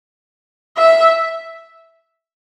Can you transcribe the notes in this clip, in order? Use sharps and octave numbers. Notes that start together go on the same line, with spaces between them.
E5